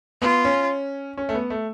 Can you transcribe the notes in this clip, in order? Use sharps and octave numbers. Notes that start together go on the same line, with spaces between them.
B3 F4
C#4
C#4
A3
B3
A3